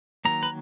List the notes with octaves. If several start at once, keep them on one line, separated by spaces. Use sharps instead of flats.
D#3 F#3 A#3 A#5
B4